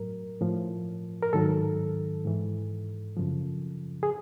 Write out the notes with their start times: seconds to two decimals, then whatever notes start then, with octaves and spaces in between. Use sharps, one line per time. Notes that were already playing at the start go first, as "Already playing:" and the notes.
Already playing: A2 F#3 A#4
0.41 A2 F3
1.22 A#4
1.33 G#2 D#3 F#3 A4
2.25 G#2 E3
3.17 F#2 C#3 F3
4.03 G#4